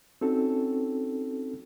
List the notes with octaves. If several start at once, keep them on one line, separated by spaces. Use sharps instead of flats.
C4 C#4 D#4 F#4 A4